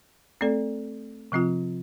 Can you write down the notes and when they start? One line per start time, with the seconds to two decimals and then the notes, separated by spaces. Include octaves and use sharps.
0.41 A3 C4 A4 D5
1.32 C3 F3 C4 F4